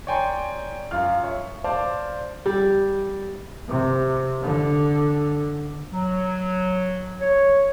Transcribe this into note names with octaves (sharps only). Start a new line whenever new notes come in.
C#5 D5 G5 G#5 A#5 C6
F#2 F4 F5 F6
C#5 E5
C5 D5 F5 A5 D6
G3
C3
D3
F#3
C#5